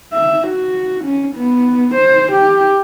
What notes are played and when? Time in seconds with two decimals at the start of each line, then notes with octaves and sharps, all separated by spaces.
0.13 E5
0.47 F#4
1.04 C#4
1.36 B3
1.95 C5
2.32 G4